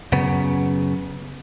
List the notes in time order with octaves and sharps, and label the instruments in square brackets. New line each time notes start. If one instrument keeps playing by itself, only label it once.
[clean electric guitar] F#2 C#3 B3